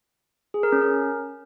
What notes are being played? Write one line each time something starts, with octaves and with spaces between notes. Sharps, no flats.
G#4
A#4
C#4
A#4